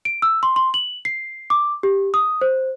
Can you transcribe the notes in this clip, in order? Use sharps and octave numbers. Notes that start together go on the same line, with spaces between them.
D7
E6
C6
C6
F#7
C7
D6
G4
D#6
C5